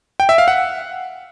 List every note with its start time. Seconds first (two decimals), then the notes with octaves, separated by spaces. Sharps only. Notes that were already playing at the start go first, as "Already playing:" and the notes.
0.20 G5
0.29 E5
0.38 F5
0.48 F#5